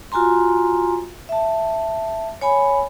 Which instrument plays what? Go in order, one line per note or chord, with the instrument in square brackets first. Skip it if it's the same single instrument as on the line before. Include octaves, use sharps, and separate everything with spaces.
[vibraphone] F4 F#4 G#5 A#5 C6
E5 A5
C#5 G#5 B5